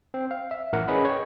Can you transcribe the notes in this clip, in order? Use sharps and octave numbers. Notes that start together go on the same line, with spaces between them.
C4
F5
E5
A1 A2 A#4 F#5
C#4 G#4 B4 D#5 B5
C#5 G5